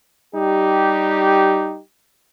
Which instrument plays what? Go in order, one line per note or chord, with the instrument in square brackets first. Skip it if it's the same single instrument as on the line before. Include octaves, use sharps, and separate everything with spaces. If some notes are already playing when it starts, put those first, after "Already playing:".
[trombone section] G3 D#4 G4